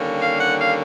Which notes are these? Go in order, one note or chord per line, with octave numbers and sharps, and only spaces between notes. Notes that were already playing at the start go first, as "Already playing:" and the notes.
Already playing: D#2 D3 G3 A#3 C#4
F5
F#5
F5